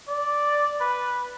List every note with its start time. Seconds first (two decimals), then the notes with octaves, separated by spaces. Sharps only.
0.08 D5
0.81 B4